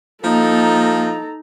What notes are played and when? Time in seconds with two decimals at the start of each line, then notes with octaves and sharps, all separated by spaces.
0.24 F3 A#3 D#4 A4 A#5